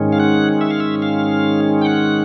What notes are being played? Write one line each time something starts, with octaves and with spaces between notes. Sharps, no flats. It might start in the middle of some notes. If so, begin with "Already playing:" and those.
Already playing: G#2 D#3 G#3 C#4
F5
F#5
E5
F5
E5
F5
G5
F#5